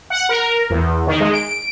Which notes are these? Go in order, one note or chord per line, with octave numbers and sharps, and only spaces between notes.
F#5
A#4
E2
D#3
G#3
D7